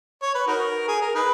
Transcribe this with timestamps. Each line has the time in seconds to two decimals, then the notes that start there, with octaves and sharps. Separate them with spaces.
0.22 C#5
0.34 B4
0.47 D#4 F#4 A#4
0.88 G#4
1.01 A#4
1.15 D#4 G#4 B4